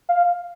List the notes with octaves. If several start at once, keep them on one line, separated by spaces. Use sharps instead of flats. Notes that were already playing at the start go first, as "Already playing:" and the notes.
F5